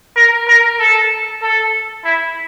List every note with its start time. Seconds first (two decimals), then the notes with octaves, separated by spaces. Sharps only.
0.16 A#4
0.48 A#4
0.79 A4
1.42 A4
2.05 E4